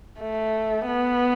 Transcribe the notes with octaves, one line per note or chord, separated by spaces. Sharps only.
A3
B3